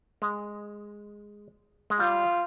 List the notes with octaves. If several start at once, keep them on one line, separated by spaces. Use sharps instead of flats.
G#3
G#3
G3 F4